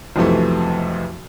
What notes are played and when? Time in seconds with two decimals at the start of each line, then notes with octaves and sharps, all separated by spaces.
0.16 B1 F2 C3 E3 A3